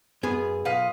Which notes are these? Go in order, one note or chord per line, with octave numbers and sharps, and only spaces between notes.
F#2 B3 G#4
B1 F4 B4 D#5